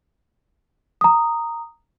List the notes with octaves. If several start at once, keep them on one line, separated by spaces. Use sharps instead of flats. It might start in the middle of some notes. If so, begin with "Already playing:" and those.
A#5 D#6